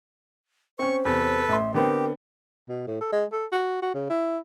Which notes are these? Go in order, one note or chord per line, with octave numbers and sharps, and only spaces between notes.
C4 C#4 C5 C#6
E2 C3 A4 B4
A1 E5 C6
D3 B3 C4 G4 A#4
B2
A2
A4
G#3
A4
F#4
F#4
C#3
E4